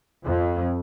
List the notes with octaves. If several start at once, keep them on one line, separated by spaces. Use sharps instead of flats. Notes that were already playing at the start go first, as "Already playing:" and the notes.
F2